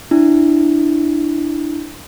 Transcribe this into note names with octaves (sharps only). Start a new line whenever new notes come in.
D4 E4